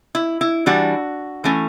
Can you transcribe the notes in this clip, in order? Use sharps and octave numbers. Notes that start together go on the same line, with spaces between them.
E4
E4
E3 G3 D4 F#4
E3 A3 C#4